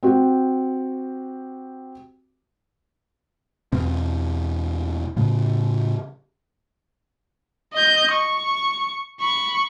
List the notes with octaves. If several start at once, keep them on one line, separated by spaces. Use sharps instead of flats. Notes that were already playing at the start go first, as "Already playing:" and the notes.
C4 F#4 G4
E2 B2 C4
A2 C#3
D#5 G6
C#6
B5 C#6